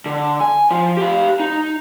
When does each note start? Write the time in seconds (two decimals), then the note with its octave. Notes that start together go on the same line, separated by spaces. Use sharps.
0.06 D3
0.40 G#5
0.71 F3 F4
0.97 G4 F5
1.40 D#4